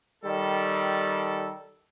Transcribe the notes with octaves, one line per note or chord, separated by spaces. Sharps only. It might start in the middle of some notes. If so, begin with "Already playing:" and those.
D#3 G3 A4